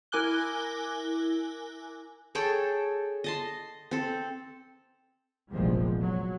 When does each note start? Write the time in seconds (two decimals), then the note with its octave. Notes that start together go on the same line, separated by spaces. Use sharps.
0.12 E4 A#4 G#5 D6 F#6 G7
2.35 G#4 A4 C#5 G5
3.24 D#5 A5 C6
3.91 C4 A4
5.51 F1 A#1 E2 F3 G3 G#3
6.00 F#3